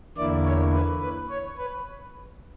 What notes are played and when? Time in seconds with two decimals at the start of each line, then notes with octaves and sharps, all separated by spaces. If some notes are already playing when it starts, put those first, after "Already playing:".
0.17 E2 D3 A#3 E4 D5
0.45 C#5
0.73 B4
1.01 B4
1.29 C#5
1.58 B4